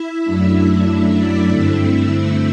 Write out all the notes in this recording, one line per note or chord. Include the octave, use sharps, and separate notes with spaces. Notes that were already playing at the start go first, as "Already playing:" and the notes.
Already playing: E4 E5
F#2 F#3 A3 D4
E4 E5
D4 D5
G2 D3 A3 C4 E4 E5
E4 E5